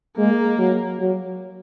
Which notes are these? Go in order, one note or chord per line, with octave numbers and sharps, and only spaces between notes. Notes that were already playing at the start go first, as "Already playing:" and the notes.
G#3 A#3
F#3
F#3